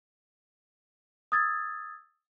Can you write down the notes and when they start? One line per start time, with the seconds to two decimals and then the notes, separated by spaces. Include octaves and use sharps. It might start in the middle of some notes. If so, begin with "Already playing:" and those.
1.32 D#6 E6 G#6 A6